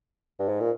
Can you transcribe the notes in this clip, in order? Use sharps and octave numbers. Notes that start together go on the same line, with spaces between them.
G2
G#2
A#2